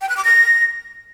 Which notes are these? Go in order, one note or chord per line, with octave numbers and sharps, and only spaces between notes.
G5
F#6
D6
A#6